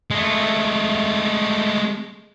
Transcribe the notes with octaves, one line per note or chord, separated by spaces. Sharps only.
G#3 A3